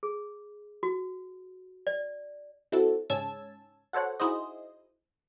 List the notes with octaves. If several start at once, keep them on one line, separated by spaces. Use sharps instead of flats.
G#4
F#4
D5
C4 E4 F#4 A4
G#2 C#3 C#4 A5 E6 G#6
F#4 A4 C5 C#5 F#5
D#4 E4 F#4 G#4 C5 D#5